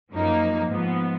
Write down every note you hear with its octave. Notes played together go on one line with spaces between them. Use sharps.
F#2 F3 A#3 D#4
G#2 F3 B3